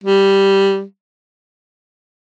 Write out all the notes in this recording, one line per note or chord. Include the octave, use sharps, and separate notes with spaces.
G3